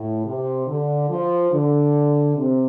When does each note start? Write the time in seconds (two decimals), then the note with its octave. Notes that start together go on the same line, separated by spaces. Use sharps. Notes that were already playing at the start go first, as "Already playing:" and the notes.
Already playing: A2
0.26 C3
0.68 D3
1.10 F3
1.52 D3
2.36 C3